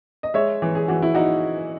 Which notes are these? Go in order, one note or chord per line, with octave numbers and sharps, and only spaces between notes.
D#5
G#3 C#5 E5
E3
G#4
E3 F#4
E4
D#4 F#4